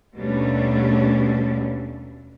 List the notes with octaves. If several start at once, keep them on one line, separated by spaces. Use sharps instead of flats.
D#2 B2 G3 A3 C#4 D4